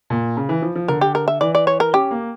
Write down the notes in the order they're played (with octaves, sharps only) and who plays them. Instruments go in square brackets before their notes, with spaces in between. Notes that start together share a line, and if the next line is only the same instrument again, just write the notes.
[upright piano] A#2
C#3
E3
F3
F3
[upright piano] D3 [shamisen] A#4
[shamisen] G4
A#4
E5
[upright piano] E3 [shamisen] D5
[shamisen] D5
C#5
A#4
[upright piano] C#4 [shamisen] G4
[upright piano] A#3